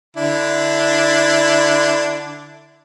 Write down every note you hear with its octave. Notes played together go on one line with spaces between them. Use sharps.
D3 D4 E4